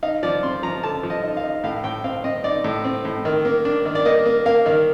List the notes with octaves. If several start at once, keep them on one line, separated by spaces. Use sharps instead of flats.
D#4 F5
F3 D5
C4 C6
F3 A#5
D3 A5
F3
D#5
D#4
F5
D#4
A2 F5
A2 G5
C4 F5
C4 D#5
D#4 D5
A2
C4
A2
D#3
A#3
D4
D#3
D5
A#3 D#5
A#3
A#3 F5
D#3